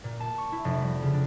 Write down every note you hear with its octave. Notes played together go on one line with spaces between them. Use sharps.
A#2
A5
C#6
E4
F1
G3
C#3
D4